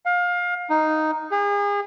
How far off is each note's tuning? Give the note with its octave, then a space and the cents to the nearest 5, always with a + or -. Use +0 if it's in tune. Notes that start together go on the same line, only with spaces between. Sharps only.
F5 +25
D#4 +0
G#4 -35